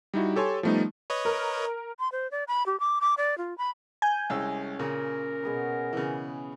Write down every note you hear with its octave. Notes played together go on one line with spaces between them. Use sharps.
G3 D#4 E4 F#4
G4 A4 C#5 G#5 C6
F3 G3 A3 B3 D#4
B4 C#5 D#5
A#4
C6
C5
D5
B5
G4
D6
D6
D5
F4
B5
G#5 G6
C2 G#3 C#4 E6
A#2 C#3 A#4
B2 G#4 B4
C#3 E3